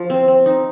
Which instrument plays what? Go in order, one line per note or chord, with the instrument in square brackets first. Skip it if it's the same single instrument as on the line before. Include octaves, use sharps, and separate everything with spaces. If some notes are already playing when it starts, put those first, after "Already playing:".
Already playing: [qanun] F3
C4
C4
D#4